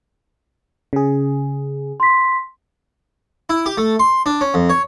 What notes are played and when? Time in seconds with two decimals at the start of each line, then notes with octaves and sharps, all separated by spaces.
0.93 C#3 G#4
2.00 C6 B6
3.49 E4
3.66 G4
3.78 A3
3.99 C6
4.26 D4
4.41 C#4
4.54 F2
4.70 C#5